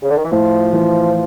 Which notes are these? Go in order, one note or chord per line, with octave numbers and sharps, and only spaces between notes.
C#3
D3
D#3
E3
A2 F3
E3